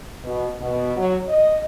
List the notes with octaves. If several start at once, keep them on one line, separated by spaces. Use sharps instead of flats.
B2
B2
F#3
D#5